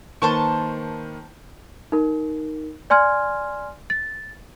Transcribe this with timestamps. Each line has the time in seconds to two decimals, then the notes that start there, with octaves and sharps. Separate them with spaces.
0.22 D#3 A#3 B4 C5 A5 C#6
1.92 D#4 A#4
2.90 D5 G#5 C6 F6 G#6
3.90 A6